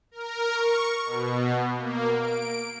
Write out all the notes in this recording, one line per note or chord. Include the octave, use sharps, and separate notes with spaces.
A#4
C#6
B2
A#3
D7